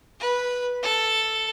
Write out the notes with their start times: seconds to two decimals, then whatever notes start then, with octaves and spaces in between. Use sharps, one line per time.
0.20 B4
0.83 A4